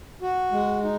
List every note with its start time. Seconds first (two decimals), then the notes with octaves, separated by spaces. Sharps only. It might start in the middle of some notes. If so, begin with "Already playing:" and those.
0.22 F#4
0.52 G#3
0.83 D#4